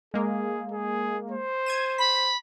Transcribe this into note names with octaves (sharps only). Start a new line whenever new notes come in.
G#3 A#3 G#4
G#4
C5
G#6 D#7 E7
B5 B6